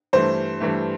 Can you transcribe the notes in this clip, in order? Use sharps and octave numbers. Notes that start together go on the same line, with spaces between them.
G2 E3 A3 C5
G2 E3 A3